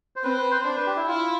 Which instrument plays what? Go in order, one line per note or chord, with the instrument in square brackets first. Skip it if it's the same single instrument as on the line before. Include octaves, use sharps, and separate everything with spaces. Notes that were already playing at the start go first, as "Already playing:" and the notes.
[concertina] C5
[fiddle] C4 [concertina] B4
[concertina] B4
C5
[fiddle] D4 [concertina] C5
[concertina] B4
G4
E4
[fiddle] E4 [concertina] F4